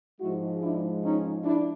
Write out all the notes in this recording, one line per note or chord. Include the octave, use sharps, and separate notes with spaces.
G#2 F3 G#3 E4 F#4
D4 E4
C#4 D#4
D4 E4